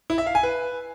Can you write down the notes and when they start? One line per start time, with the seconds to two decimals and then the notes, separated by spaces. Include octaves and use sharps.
0.10 E4
0.18 E5
0.27 F5
0.35 G#5
0.43 B4